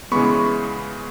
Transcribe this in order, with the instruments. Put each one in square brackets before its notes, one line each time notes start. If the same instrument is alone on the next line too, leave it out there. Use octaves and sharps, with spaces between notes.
[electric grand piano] C#3 E3 G#3 B3 B5 C#6